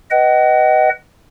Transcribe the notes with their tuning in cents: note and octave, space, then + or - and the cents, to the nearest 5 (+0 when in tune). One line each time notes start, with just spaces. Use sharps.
B4 +0 D#5 +0 F#5 +45